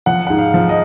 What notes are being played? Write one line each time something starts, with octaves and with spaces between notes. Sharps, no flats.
F3 F#5
G#2 F#5
F5
F3
D#5